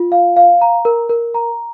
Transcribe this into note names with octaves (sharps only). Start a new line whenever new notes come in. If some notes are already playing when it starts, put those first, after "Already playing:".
Already playing: F4
F5
F5
A#5
A#4
A#4
A#5